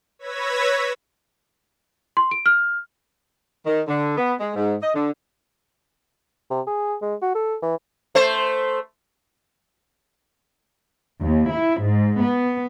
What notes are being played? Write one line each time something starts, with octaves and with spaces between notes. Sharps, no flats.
B4 C#5 E6 G#6 A#6 B6
C6
D7
F6
D#3
D3
B3
G#3
G#2
D#5
D3
C3
G#4
G#3
F#4
A4
E3
A3 C5
D#2
E4
G#2
B3